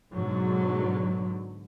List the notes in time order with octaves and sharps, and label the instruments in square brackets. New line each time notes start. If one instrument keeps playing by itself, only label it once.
[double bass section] G#2 B2 D3 F#3